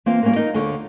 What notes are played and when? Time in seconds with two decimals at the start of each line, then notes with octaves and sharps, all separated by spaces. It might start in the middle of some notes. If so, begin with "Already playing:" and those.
0.06 E3 A#3 C4 F4 F5
0.23 G3 A#3 B3 C#4 F#4 A#4
0.36 D#4 F4 A#4 D#5
0.54 D2 D3 F4 A4 C#5